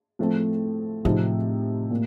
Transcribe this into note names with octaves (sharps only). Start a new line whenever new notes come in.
A2 F3 A3 C4
A2 C3 F3 C4 D#4
A#2